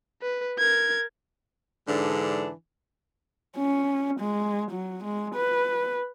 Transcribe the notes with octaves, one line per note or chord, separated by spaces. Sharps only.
B4
A#4 G#6
G#2 D3 E3 D4
C#4
G#3
F#3
G#3
B4